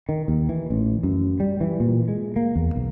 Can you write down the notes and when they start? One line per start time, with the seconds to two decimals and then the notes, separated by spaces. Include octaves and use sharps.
0.09 D#3
0.28 D#2
0.49 E3
0.70 A1
1.03 F#2
1.40 G3
1.61 E3
1.80 A#2
2.08 G#3
2.36 A#3
2.55 E2
2.76 B1